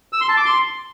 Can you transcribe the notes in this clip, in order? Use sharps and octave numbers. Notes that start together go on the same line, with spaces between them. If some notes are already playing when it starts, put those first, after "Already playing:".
E6
C6
A5
D6
C6